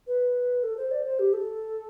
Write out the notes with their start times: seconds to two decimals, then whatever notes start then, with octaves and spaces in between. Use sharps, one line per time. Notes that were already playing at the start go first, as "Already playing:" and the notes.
0.07 B4
0.63 A4
0.77 C5
0.91 D5
1.05 C5
1.19 G4
1.33 A4